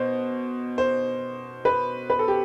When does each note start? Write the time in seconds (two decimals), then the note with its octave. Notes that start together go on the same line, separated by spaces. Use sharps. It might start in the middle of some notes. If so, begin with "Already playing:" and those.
Already playing: B2 C5
0.78 C5
1.65 B4
2.10 B4
2.19 A4
2.28 G4